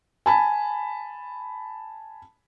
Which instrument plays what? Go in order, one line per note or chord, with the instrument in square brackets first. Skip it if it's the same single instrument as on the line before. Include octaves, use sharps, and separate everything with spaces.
[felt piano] G#5 A5 B5